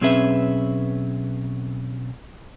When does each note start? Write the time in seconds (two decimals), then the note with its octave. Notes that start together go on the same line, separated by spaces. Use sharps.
0.01 B1 C4 C#4 G#4 B4 E5